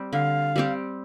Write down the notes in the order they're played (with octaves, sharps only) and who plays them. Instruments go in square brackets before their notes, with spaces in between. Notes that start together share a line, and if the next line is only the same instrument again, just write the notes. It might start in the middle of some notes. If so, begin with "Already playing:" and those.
Already playing: [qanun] G3 C4 G4
[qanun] D3 [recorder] F5
[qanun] G3 C4 G4